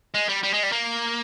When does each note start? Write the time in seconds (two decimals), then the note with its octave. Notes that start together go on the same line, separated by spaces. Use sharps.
0.14 G#3
0.29 G3
0.43 G3
0.53 G#3
0.63 G3
0.72 A#3